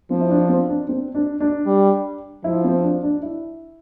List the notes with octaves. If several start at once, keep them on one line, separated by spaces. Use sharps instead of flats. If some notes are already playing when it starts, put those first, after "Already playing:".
F3 C4
E4
D4
C4
D4
C4
D4
D4
G3
F3 E4
C4
D4
D4
E4